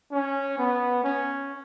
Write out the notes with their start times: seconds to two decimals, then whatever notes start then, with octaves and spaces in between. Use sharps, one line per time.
0.11 C#4
0.58 B3
1.04 C#4